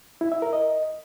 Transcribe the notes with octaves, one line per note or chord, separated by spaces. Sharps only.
E4
E5
A#4
D#5